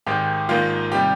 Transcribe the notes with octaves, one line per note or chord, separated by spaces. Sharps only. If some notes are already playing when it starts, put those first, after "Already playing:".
G#1 G#2 D#3 G4
G#1 G#2 D#3 A#3 F4
C3 D#3 G3 G4